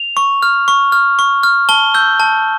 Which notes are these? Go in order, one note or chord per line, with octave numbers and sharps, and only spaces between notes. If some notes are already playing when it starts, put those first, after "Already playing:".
Already playing: F7
C#6
F6
C#6
F6
C#6
F6
A5 G7
E6 G6
A5